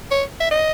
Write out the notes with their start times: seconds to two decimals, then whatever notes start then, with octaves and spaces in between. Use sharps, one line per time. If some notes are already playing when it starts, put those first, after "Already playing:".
0.11 C#5
0.40 E5
0.51 D#5